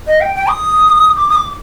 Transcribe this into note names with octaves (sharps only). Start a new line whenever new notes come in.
D#5
G5
G5
D#6
D6
D#6
D6